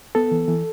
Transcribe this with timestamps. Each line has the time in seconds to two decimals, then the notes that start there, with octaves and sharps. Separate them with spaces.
0.15 B3 A4
0.31 E3
0.48 E3